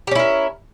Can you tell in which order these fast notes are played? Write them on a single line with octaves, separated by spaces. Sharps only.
G4 C#4 E4 A#4